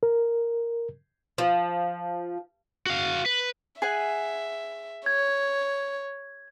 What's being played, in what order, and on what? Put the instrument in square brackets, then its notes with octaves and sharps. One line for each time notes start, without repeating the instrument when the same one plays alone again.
[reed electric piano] A#4
[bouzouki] F3
[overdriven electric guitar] F#4 F5
B4
[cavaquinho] G#4 F#5 G#5 [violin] E5
[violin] C#5 [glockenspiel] G#6